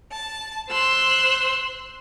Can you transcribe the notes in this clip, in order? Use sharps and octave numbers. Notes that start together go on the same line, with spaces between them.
A5
C5 C6 E6 F#6